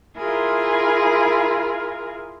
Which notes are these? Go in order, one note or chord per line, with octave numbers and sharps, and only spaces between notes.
E4 F4 G#4 A#4